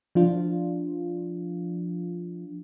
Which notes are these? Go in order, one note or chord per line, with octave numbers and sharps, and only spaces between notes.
F3 D4 F4